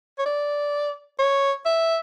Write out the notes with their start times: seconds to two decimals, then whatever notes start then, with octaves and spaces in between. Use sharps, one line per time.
0.18 C#5
0.26 D5
1.19 C#5
1.65 E5